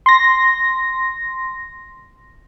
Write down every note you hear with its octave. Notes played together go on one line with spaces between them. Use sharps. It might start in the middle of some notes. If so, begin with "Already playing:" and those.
C6 A#6